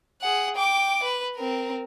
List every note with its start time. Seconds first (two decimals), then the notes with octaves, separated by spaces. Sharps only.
0.21 G#4 F#5
0.56 G5 D6
1.03 B4
1.35 C4 A#4